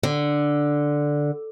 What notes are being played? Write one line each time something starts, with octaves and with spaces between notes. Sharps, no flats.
D3